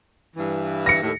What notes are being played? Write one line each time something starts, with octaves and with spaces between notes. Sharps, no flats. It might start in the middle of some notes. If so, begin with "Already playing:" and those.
G2 E3
A#6 C#7
D#2 A2